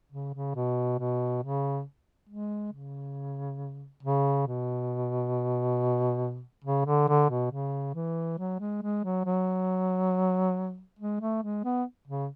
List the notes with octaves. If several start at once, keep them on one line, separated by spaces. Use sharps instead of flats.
C#3
C#3
B2
B2
C#3
G#3
C#3
C#3
B2
C#3
D3
D3
B2
C#3
E3
F#3
G#3
G#3
F#3
F#3
G#3
A3
G#3
B3
C#3